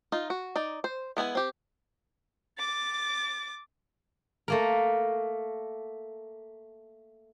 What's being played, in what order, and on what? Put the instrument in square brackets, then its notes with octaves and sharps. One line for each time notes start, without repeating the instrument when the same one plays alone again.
[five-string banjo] D#4 F4
F#4
D#4 D5
C5
G#3 B3 E4 G#5
C4 G4
[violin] D6 A6
[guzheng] A3 A#3 A#4